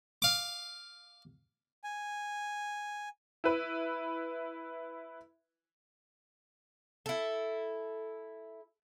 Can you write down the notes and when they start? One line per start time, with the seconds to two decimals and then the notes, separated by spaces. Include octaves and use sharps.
0.22 F5 D6
1.84 G#5
3.44 E4 B4
7.06 E4 A4